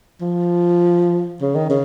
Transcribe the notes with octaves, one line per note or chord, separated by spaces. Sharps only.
F3
C#3
D#3
C#3